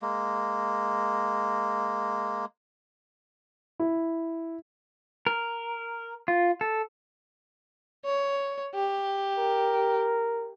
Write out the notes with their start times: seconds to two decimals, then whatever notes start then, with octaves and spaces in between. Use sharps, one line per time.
0.02 G#3 A#3
3.80 E4
5.27 A#4
6.28 F4
6.61 A4
8.05 C#5
8.75 G4
9.38 A#4